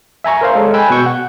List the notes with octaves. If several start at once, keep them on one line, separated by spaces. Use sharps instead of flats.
E5 G#5 A#5 C#6
A#4 C5 F5
G#3 A4 C#5
G5 G#5 B5 E6 F#6
B2 C#6 G6
F#5